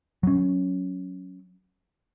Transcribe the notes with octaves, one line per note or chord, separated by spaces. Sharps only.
F#3 C#4